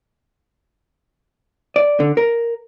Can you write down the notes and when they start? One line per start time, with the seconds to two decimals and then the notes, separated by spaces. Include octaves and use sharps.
1.76 D5
2.00 D3
2.17 A#4